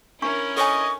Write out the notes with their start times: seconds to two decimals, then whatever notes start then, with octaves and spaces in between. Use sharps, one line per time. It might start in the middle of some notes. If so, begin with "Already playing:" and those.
0.22 C#4 D4 E4 A#4 C#6
0.57 A4 C#5 D#5 G#5 C#6